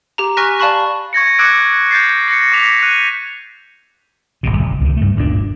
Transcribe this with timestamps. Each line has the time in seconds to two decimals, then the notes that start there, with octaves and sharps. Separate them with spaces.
0.18 G4 A#5
0.37 G#5 C#6 F6 F#6 A#6 B6
0.59 D5 F5 A5 B5 C#6 F#6
1.13 C#6 G#6 A#6 C#7
1.39 D6 E6 F#6 G#6 C#7 D7
1.91 G6 A6 C7
2.28 A#6 C#7
2.52 D6 A#6 B6 F7
2.83 F#6 D#7
4.43 D1 G#1 F2 B2
4.58 F#1
4.81 C#2 C3 D#3
4.97 G2 A3
5.16 G1 D2 A#2 D4